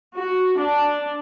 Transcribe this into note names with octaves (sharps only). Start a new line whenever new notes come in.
F#4
D4